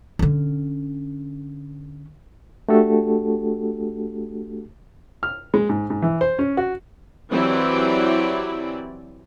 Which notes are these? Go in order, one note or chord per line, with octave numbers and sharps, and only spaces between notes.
D3 C#4
A3 D4 F#4 G4 A4
F6
G#3
G#2
G#2
E3
C5
C#4
F#4
E3 F#3 C4 E4 G4 D5